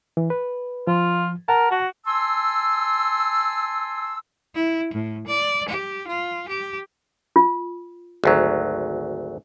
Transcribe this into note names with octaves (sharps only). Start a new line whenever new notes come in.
E3
B4
F3 F4
A#4 F#5 A5
F#4
G#5 A5 C6 E6
E4
A2
D5
G4
F4
G4
F4
G#1 D2 F#3